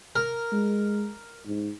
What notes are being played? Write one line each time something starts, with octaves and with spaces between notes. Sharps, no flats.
A#4
G#3
G#2